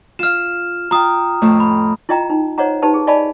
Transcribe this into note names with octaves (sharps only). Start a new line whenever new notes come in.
F4 F5 F6 E7
F4 G5 A#5 D#6
F2 A2 A3
B5
E4 F4 D#5 G5 A#5
D#4
C5 C#5 D#5 F#5 A#5
D#4 G4 B4 A5
G#4
D5 D#5 F5 G#5 A5 B5